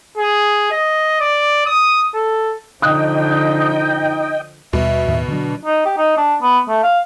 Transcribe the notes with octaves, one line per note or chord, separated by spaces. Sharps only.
G#4
D#5
D5
D#6
A4
D3 F3 D#4 D#5 G5 D#6 F#6
D#2 B2 G3 E5
D#2 A2 D#3
D3 F#3 D4
D#4
G4
D#4
D4
B3
A3
F5